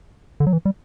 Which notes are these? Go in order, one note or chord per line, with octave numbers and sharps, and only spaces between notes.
D3
F#3
E3
G3